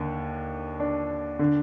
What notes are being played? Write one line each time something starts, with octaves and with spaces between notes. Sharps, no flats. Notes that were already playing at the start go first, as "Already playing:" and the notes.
Already playing: D#2 D3
D4
D3